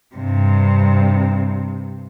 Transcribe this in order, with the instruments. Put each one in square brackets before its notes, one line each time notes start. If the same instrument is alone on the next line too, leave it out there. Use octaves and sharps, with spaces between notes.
[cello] G2 C3